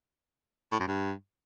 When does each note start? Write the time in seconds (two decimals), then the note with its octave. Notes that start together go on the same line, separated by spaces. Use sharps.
0.72 A2
0.80 F#2
0.88 G2